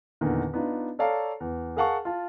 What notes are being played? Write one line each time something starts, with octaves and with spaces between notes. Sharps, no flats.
E2 A#2 D3 D#3
B3 D4 D#4 F4
A4 C#5 D5 F5 A5 A#5
E2
G#4 A#4 F5 F#5 A5 C#6
F4 A5